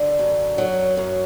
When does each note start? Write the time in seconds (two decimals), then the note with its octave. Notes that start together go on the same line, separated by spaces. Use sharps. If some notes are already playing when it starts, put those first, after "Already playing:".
Already playing: D3
0.19 F#2
0.58 F#3
0.97 F#2